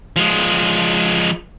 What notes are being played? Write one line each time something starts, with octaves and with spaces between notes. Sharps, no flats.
F3 G#3